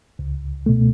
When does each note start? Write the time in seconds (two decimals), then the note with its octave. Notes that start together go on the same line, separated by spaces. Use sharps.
0.19 C#2
0.66 B2 A3